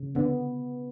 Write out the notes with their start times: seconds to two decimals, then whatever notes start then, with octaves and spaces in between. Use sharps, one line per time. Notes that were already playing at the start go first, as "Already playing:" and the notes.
Already playing: C#3
0.15 D3 B3